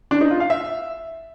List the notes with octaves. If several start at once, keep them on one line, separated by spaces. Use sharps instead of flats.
D4
D#4
F4
F5
E5